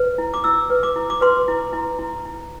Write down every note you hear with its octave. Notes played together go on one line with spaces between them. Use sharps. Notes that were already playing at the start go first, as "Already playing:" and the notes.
Already playing: B4
E4
D6
E4 E6
B4
D6
E4
D6
B4 C6
E4
E4
E4
E4